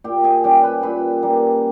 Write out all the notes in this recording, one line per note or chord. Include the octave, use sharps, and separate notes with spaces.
A#2 G4 G5
G#4 G#5
G3 C#4 G4 G5
B4 B5
A#2 B4 B5
G3 A#3